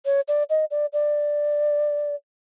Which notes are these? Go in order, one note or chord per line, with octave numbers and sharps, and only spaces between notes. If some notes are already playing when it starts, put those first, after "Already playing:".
C#5
D5
D#5
D5
D5